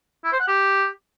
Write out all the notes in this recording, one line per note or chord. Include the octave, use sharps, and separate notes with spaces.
E4
C5
F#5
G4